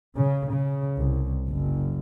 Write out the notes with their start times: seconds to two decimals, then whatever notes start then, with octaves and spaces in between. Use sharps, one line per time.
0.15 C#3
0.50 C#3
0.99 C2
1.48 F#1